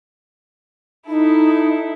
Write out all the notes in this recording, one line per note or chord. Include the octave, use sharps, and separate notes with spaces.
D#4 E4 A4